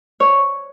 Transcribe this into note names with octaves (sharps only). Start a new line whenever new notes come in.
C#5